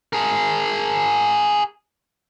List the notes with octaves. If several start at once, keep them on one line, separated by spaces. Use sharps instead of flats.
G#4 A#4